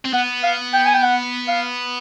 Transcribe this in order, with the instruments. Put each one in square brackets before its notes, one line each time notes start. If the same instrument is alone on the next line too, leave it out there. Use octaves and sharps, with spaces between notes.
[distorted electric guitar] C4
[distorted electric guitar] B3 [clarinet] F#5
[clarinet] F5
G5
G#5
G5
F#5
F5